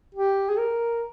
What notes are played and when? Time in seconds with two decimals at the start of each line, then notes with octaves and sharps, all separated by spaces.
0.15 G4
0.49 G#4
0.58 A#4